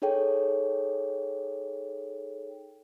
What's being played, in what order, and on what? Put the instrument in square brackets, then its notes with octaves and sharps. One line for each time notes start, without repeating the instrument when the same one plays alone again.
[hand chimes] D#4 G#4 A4 C#5 G5